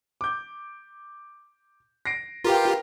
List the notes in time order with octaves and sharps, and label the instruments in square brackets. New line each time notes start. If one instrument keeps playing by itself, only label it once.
[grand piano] D6 G6
A#6 C7 D7
[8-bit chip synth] F4 G4 [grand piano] A#4 B4 G5